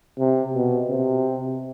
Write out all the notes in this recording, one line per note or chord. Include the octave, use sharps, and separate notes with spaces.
C3
B2
C3